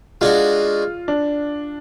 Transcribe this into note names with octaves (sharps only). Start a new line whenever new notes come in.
G#3 D4 F4 F#4
D4